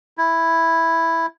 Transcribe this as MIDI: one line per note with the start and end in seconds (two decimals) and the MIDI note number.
0.18 1.26 64